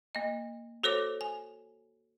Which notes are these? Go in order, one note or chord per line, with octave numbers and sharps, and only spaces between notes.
A#3 D#5
F#4 A4 C5 C#5 D6
G#5